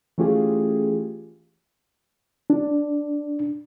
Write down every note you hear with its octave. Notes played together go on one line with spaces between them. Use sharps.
E3 A3 C#4 F4 G4 G#4
D4